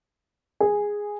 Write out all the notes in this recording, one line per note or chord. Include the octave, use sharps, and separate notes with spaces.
G#4